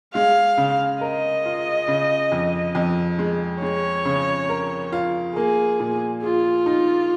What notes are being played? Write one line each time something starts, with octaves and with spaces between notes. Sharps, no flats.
G#3 F5
C#3
A#4 D#5
F4
C#3
F2
F2
G#3
G#3 C#5
C#3
A#4
F4
A#3 G#4
A#2
F4 G#4
D#4